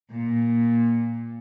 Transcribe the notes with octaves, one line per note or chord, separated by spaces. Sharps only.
A#2